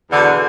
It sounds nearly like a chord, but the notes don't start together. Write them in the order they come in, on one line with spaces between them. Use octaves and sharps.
E2 D3 B2